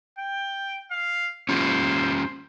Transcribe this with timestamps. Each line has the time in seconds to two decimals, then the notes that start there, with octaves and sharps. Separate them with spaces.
0.18 G5
0.91 F5
1.49 C#4 F4 G4 C5